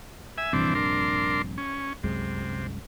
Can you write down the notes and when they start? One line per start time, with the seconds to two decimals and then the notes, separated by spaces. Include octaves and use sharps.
0.38 E5 G#5
0.53 A#1 G2 C3 E3 C4 D4
0.75 D4 A#4 C6
1.58 C#4
2.03 C2 F#2 C3 G#3